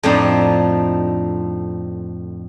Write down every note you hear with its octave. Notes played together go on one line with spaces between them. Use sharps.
F2 A2 F3 C4 D4 D#4